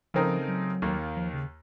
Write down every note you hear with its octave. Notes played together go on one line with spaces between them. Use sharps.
C#3 F3 A3 C4 D#4 A#4
F#3
D#2 D#3 A#3
F3
C#3